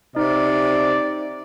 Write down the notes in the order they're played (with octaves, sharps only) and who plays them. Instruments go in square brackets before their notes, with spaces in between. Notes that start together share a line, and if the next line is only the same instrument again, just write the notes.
[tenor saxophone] C3 [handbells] D#4 [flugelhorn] D5